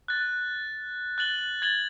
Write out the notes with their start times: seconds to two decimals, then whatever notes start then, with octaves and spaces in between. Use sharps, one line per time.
0.08 F#6 A6
1.18 F#6 A6 F#7 G7
1.62 G#6 A6 F#7 G7